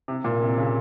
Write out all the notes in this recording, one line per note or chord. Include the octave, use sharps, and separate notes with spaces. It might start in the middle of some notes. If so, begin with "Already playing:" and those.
C3
A#2
C3
C#3